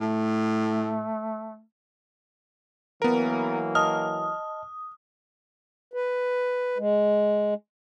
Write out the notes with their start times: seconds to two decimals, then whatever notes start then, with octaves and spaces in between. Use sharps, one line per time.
0.01 A2 A3
3.02 E3 F#3 A#3 B3 A#4
3.75 D#5 A5 D#6 F6
5.94 B4
6.78 G#3